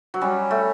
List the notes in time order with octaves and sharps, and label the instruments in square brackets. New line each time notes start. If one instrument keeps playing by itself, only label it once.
[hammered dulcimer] F#3
[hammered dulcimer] G3 [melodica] C#4
[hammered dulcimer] A3